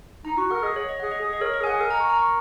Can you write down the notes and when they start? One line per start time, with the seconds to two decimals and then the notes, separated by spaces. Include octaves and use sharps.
0.25 D#4 A#5
0.37 F#4 C#6
0.51 A#4 F#5
0.63 G#4 D#5
0.76 C#5
0.89 D#5
1.00 G#4 F#5
1.11 D#5
1.21 G#4
1.33 D#5
1.41 A#4 C#5
1.54 D#5
1.60 G#4 G#5
1.67 F#5
1.80 A#4 G#5
1.90 A#5
2.00 C#6
2.10 A#5
2.18 C#6